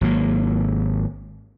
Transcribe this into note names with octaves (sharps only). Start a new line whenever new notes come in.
G#1 F#3 A#3